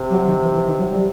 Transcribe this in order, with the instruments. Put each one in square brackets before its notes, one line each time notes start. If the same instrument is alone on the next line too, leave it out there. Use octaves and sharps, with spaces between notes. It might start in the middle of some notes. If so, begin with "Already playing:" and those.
Already playing: [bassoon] C3
[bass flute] F#3
D#3
E3
E3
D#3
F#3
G3